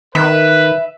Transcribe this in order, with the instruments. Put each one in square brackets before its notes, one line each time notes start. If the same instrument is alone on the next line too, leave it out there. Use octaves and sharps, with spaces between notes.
[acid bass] D#3 [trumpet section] B4 [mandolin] E5